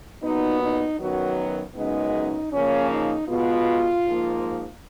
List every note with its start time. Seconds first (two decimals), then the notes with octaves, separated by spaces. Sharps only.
0.23 A#2 F#3 B3 D#4
0.62 D#4
0.99 F#2 D#3 F#3 B3 F#4
1.76 F#2 C#3 G#3 B3 D#4
2.52 C#3 F3 A#3 C#4
2.91 D#4
3.28 B2 G#3 B3 F4
4.05 G#2 F3 A#3